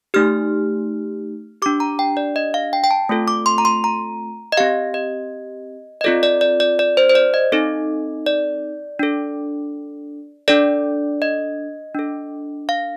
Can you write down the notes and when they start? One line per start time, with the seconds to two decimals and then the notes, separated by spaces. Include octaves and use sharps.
0.14 A3 D#4 G4 F6
1.62 D4 G4 D6
1.80 A#5
1.99 G5
2.17 D5
2.36 D#5
2.54 F5
2.73 G5
2.84 G5
2.91 A5
3.09 A3 C4 F4 A4
3.28 D6
3.46 C6
3.58 A#5
3.65 C6
3.84 A#5
4.52 D#5
4.57 C4 G4 F5
4.94 D#5
6.01 D#5
6.04 C4 F4 A4 D5
6.23 D5
6.41 D5
6.60 D5
6.79 D5
6.97 C5
7.09 C5
7.15 D5
7.34 D#5
7.52 C4 D#4 A4
8.26 D5
8.99 D4 A4
10.48 D4 A4 D5
11.22 D#5
11.94 D4 A4
12.69 F5